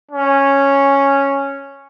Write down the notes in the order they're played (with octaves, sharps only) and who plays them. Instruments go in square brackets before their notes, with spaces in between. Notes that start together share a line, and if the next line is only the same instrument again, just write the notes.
[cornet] C#4